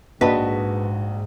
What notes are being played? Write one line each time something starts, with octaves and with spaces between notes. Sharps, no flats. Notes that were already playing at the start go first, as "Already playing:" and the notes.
A#1 G#2 F#4 B4 D#5 A5